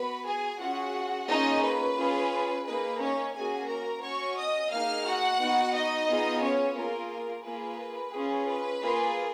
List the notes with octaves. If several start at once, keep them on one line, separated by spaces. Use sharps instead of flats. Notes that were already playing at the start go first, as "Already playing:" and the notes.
Already playing: B3 F#4 B4 B5
G#4 G#5
C#4 F4 F#4 G#4 F#5
A#3 C#4 D#4 F4 G#4 D#5
B4
C#4 F4 G#4
A#3 D#4 G#4 B4
C#4 C#5
A#3 C#4 F#4 G#4 G#5
A#4 A#5
C#4 F#4 C#5 C#6
D#5 D#6
A#3 D#4 G#4 F5 F6
F#4 F#5
B3 D#4 F#4
D#4 D#5
B3 F4 G#4
C#4 C#5
A#3 F4 G#4 A#4
A#4
A#3 F4 G#4 B4
C#4 F4 G#4
B4
A#3 F4 G#4